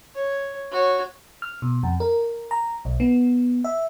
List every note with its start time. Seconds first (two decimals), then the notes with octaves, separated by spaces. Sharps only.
0.15 C#5
0.72 F#4 C#5
1.42 F6
1.62 B2
1.83 F2
2.00 A#4
2.51 A#5
2.85 B1
3.00 B3
3.64 E5